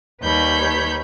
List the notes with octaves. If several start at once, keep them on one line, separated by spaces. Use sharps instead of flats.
D#2 G3 B4 C#5 B5 G6